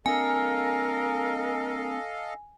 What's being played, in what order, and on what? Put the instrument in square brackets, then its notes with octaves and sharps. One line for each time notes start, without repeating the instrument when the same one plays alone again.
[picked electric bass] C4 D4 [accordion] A4 D#5 F5 [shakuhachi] A#4 [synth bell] G#5